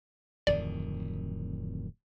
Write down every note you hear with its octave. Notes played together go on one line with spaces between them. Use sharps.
D1 F2 D#3 D5